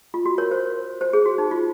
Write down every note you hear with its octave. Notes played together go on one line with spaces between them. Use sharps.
F4
F#4
A#4 C#5
C5
C5
G#4
F#4
D#4
F4